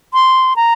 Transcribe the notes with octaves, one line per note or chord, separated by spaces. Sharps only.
C6
A#5